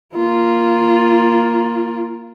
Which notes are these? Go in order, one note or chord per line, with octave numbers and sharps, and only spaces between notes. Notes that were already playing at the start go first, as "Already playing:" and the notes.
A#3 F4